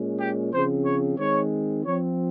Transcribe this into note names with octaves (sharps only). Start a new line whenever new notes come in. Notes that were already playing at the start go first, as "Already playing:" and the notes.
Already playing: A#2 G#3 C#4
G4
C#3 F3 C4 C5
C#5
D#3 G#3 C4 C#5
F3 C4 C#5